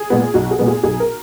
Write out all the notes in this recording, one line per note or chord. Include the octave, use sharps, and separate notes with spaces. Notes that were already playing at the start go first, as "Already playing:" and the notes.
Already playing: G#4
A#2 G#3 B3
B1 F#4
G#4
A#2 G#3 B3
G#4
B1 G#4
A#4